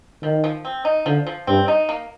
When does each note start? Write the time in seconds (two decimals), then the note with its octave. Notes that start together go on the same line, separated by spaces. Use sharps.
0.23 D#3 F3
0.44 F3
0.65 C4
0.85 D#4
1.06 D3 F3
1.27 F3
1.47 G2 C4
1.68 D#4
1.89 A#3